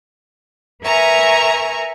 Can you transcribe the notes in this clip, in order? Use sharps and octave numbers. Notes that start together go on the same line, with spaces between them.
A#4 B4 E5 G#5 A#5 C#6